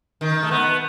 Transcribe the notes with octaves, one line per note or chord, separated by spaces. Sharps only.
D#3
A3
B3